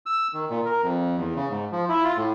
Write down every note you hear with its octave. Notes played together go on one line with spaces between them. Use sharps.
E6
D#3
A#2
A#4
F2
E2
C#3
G#2
F3
E4
F4
A2